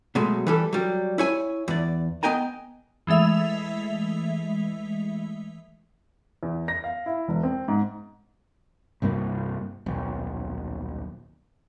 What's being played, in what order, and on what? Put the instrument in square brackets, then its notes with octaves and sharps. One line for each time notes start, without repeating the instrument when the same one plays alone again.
[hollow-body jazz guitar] B2 F#3 G#3 A3
E3 G3 A4
F#3 G3
E4 C#5 G#5
E2 D5
B3 D#5 G5 G#5 A#5
[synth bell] E3 G#3 A3 E5 F7
[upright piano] E2
A#6
F5
E4
E1
C4
G#2
[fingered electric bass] C2 G2 G3 A#3
D#1 B1